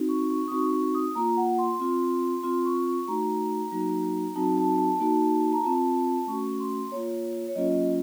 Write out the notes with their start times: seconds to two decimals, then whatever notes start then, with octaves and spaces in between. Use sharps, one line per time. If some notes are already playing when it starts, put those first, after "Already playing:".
Already playing: C4 D#4 F#4
0.09 C#6
0.30 C#6
0.48 D#6
0.51 C4 D#4 F#4 C#6
0.73 C#6
0.95 D#6
1.15 A#3 F4 A#5
1.37 F#5
1.59 C6
1.80 C4 F4
2.43 C4 F4 C6
2.66 C#6
2.86 C#6
3.08 A3 D#4 F#4 A#5
3.72 F#3 A#3 D#4 F#4
4.36 F#3 C4 D#4 F#4 A5
4.58 A5
4.78 A5
5.00 A#3 D#4 F#4
5.53 A#5
5.64 C4 F4 A5
6.27 A3 C#4 F#4 C#6
6.60 C6
6.92 A#3 F4 C#5
7.48 C#5
7.55 F#3 A#3 C#4 F4 D#5